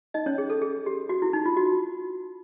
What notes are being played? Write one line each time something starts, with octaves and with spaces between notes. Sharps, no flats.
D#4 D#5
C#4 C#5
G#4
A4
G#4
G4
F#4
E4
D#4
F4
F#4